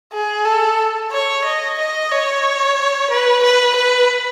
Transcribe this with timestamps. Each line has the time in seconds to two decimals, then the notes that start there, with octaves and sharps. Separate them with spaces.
0.13 G#4
0.45 A4
1.11 C#5
1.45 D#5
1.78 D#5
2.11 C#5
3.10 B4
3.43 B4
3.76 B4